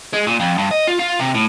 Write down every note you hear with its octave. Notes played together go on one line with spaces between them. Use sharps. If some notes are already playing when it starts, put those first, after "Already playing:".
G#3
A#2
F2
G2
D#5
F4
F4
C3
A2